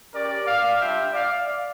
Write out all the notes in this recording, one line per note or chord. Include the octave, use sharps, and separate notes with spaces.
C#4 G4 A#4 D5
D5 F5
G3 D4 F4 E5 G5
D5 F5